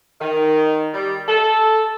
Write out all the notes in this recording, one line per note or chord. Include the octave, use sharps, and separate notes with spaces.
D#3
G3
A4